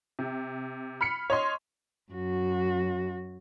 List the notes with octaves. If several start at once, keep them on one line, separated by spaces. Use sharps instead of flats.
C3
B5 F6 B6 C#7
C#5 D#5 C6
F#2 F#4